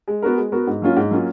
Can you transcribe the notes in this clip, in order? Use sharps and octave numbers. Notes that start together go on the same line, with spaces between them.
G#3
B3 F#4 A#4
G#3
B3 F#4 A#4
G#2
F#3 A#3 C#4 F4
G#2
F#3 A#3 C#4 F4